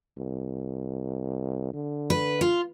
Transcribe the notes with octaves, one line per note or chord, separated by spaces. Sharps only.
C2
D3
B4
F4